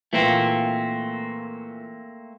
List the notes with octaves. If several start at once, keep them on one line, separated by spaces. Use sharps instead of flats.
A#2 E3 A3 A#3 C4